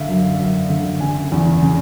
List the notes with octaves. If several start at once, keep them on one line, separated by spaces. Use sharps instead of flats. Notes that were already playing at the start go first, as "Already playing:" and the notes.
Already playing: D3 E5 F5
F#2
F#2
D3
C#3 G#5
E2
C#3